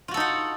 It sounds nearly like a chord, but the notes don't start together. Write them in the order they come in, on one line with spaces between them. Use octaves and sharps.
F4 F#4 A4 D#4 F#5